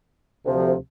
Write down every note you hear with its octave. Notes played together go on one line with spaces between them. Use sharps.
D2 C3 F3